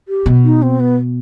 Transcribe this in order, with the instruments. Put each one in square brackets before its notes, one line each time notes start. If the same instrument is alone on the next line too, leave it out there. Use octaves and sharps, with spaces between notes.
[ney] G4
[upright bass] B2
[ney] D#4
C4
B3